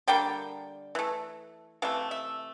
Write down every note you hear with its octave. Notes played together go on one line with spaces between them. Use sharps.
D3 G3 A#3 G5
E3 A3
C3 E3 A3 F5
E5